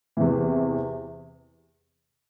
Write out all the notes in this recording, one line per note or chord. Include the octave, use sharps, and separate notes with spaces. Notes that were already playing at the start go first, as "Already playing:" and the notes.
E2 C3 E3